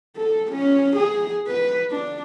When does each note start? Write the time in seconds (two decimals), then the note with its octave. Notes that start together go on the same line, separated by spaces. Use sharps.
0.17 A4
0.52 C#4
0.97 G#4
1.47 B4
1.91 D4